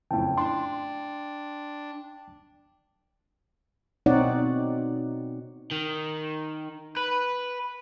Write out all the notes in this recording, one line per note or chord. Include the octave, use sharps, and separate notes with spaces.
F#1 F2 A2 G5 A5
D4 C6
B2 C4 D#4 C#5 D5 F#5
D#3
B4